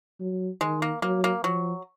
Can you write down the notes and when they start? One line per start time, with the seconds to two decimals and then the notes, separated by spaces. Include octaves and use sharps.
0.20 F#3
0.61 D#3 G#3
0.82 A#3
1.02 F#3 A#3
1.24 A#3
1.44 F3 F#3